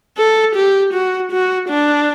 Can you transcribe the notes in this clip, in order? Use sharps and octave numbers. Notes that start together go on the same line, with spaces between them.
A4
G4
F#4
F#4
D4